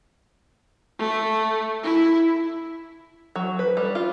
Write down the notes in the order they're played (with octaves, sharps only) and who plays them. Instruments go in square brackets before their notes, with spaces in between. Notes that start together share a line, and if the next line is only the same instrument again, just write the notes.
[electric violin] A3
E4
[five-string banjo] F#3
B4
G3
F4